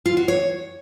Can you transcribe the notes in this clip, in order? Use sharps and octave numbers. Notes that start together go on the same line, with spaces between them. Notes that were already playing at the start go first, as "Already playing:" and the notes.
F4
F#4
C#5